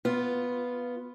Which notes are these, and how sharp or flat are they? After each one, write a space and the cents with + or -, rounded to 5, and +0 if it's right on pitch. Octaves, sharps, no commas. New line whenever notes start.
B3 +0 F4 +0